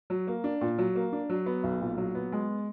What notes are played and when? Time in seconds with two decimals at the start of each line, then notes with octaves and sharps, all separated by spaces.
0.10 F#3
0.27 A#3
0.44 D4
0.61 A#2
0.78 F#3
0.95 A#3
1.13 D4
1.30 F#3
1.46 B3
1.63 B1
1.81 A#2
1.98 F#3
2.15 B3
2.32 G#3